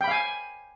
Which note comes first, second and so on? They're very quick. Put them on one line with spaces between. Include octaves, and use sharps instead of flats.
G5 B5 F5 G#5